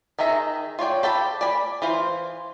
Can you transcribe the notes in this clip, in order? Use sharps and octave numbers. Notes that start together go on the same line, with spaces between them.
D#3 D#4 G#4 E5 A#5
F4 C#5 D5 G5
G4 A4 G5 B5
D5 G#5 B5
E3 F4 C5